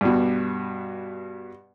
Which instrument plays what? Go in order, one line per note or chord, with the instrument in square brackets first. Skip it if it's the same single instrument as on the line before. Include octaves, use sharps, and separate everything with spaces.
[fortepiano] G2 B2